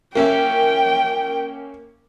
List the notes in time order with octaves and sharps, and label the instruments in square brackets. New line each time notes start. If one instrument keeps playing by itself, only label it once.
[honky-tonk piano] A#3 C#4 E5 [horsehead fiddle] G5